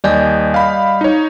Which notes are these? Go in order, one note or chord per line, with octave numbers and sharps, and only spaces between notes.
D#2 G3 D5 D#5 G#5 G6
F5 B5
D#4 C#5